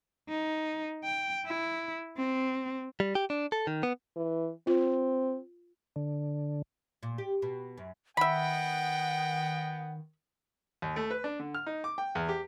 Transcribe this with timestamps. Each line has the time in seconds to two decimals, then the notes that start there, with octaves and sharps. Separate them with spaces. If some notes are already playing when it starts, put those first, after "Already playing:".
0.29 D#4
1.04 G5
1.46 E4
2.17 C4
3.00 G3
3.15 G4
3.30 D4
3.52 A4
3.67 D#3
3.83 B3
4.16 E3
4.67 C4 F4
5.96 D3
7.03 A#2
7.18 G4
7.42 B2
7.78 F#2
8.17 D#3 B3 D#5 E5 F#5 G5 B5
10.82 D#2
10.96 A3
11.10 B4
11.24 D4
11.39 D3
11.55 F6
11.66 D#4
11.84 D6
11.98 G5
12.15 E2
12.29 G4